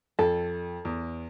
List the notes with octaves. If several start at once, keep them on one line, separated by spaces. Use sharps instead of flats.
F2 A4
E2